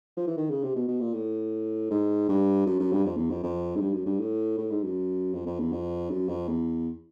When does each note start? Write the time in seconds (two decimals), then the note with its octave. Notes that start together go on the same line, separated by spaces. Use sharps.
0.17 F3
0.27 E3
0.37 D#3
0.51 C#3
0.63 C3
0.76 B2
0.88 B2
1.01 A#2
1.14 A2
1.90 G#2
2.29 G2
2.66 F#2
2.80 F#2
2.92 G2
3.05 F2
3.17 E2
3.30 F2
3.43 F2
3.76 G#2
3.81 G2
3.94 F#2
4.06 G2
4.20 A2
4.58 A2
4.71 G#2
4.83 F#2
5.34 F2
5.46 F2
5.60 E2
5.72 F2
6.10 F#2
6.29 F2
6.49 E2